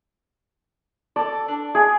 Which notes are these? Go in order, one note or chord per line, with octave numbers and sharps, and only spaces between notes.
A4 D5
D4
G#4